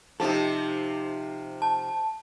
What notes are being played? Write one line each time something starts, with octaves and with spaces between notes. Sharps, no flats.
C3 F3 D#4 G4 A4
A5